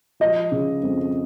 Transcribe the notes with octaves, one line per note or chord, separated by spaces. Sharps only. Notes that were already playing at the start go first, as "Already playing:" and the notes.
F3 D#5
C#3
F2